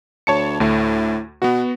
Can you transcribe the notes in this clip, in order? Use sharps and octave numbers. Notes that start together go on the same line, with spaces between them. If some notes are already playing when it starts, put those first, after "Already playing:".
D2 C#5 A5 C#7
D2 A2 A3
B2 B3 F#4